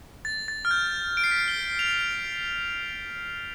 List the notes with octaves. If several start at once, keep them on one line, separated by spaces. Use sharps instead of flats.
A6
A6
F6
G6
D7
C7
B6
C7
G7
F7